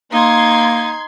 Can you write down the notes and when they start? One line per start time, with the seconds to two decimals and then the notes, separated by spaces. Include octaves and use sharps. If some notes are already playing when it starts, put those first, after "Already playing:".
0.12 A#3 D#4 C6 G#6